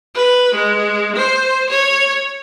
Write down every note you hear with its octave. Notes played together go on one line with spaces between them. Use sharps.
B4
G#3
C5
C#5